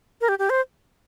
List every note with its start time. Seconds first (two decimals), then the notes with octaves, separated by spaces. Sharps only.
0.21 A#4
0.29 G4
0.39 G4
0.50 C5